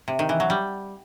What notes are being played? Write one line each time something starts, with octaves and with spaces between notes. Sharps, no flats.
C3
D#3
E3
F#3
G3